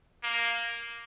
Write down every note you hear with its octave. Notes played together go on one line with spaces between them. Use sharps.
A#3